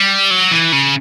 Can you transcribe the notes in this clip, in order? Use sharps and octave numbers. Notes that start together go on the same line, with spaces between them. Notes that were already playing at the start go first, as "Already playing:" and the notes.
Already playing: G3
F#3
E3
C#3